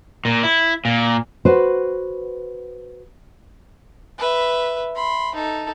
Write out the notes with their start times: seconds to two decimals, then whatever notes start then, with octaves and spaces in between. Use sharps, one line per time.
0.25 A#2
0.43 E4
0.85 A#2
1.45 F#4 B4 C5
4.18 B4 E5
4.95 B5 C6
5.35 D#4 A4